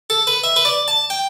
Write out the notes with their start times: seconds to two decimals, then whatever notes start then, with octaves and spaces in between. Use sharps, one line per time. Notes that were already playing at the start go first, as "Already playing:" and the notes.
0.10 A4
0.27 B4
0.44 E5
0.56 B4
0.65 D5
0.88 A5
1.10 G5